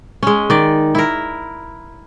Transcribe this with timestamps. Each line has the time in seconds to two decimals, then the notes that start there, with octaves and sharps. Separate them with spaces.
0.23 G#3 C#4
0.50 D#3 D5
0.95 E4 A#4